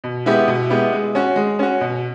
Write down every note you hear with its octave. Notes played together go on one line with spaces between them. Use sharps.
B2
G#3 B3 E4 G4
B2
G#3 B3 E4 G4
G#3
C#4 F#4
G#3
C#4 F#4
B2